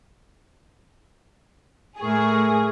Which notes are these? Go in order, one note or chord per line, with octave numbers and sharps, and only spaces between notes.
A2 A3 G#4 A#4 C#6